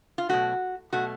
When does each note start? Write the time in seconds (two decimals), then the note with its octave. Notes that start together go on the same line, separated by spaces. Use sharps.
0.18 F4
0.29 B2 F#3 A3 F#4
0.93 B2 F#3 A3 F#4